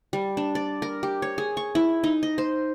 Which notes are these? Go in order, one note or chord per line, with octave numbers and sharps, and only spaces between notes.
G3
D4
D5
A#4
G4
C#5
G#4
C#6
E4
D#4
D#5
C5